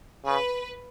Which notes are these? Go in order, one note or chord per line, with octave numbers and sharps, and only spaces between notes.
C#3 B4